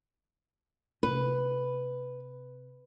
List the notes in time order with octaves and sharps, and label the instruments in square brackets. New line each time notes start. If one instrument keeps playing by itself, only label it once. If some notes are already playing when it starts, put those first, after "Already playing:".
[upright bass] C3 [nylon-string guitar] B4